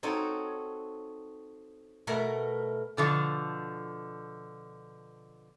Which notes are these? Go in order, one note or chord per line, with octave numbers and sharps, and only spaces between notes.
C4 D#4 F#4 A4 C#5
B2 A3 A#4 E5 F#5
B2 D3 F3